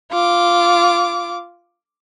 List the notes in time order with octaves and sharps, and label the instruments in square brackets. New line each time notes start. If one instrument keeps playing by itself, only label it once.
[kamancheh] F4 D6